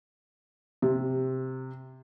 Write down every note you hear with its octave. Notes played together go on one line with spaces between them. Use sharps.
C3